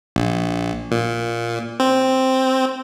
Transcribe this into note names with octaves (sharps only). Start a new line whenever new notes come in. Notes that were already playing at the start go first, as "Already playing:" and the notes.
A#1
A#2
C4